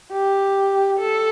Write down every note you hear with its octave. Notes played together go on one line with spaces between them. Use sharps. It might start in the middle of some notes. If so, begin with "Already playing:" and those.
G4
A4